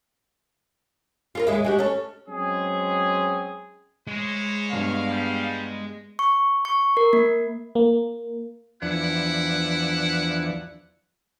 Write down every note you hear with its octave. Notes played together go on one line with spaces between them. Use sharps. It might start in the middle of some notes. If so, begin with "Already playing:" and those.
F4 A4 A#4
D#2 G#3 E5
G#3 F#4 G4
C#4 A4
F#3 G#3 C4 C#4 G#4
G#3 E4 C5 C#5
G2 B3 F5
G3
C#6
C#6
A#4
A#3
A#3
E2 F3 D4 E4 B4 F#5